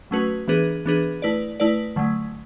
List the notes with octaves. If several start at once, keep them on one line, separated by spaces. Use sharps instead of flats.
F#3 A3 C#4 F#4 B4
E3 B3 D4 G#4 B4
E3 B3 D4 G#4 B4
A3 E4 B4 D5
A3 E4 B4 D5
D3 F#3 A3